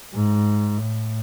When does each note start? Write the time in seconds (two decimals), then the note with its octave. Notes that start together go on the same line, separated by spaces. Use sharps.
0.14 G#2
0.77 A2